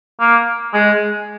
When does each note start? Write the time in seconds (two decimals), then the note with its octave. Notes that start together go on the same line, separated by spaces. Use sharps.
0.20 A#3
0.74 G#3